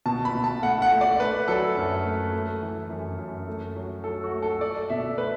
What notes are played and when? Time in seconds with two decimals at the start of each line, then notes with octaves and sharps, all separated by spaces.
0.06 B2 A5
0.25 B5
0.35 B2
0.44 A5
0.62 A3 F#5
0.82 F#5
0.91 A3
1.01 D5
1.19 A3 B4
1.48 F#3 A4
1.77 F#2
2.04 A3
2.33 A3
2.61 E3
2.90 F#2
3.18 F#2
3.48 A3
3.76 F#3
4.04 F#3 A4
4.24 F#4
4.32 A3
4.42 A4
4.61 A3 D5
4.90 B2 E5
5.18 A3 B4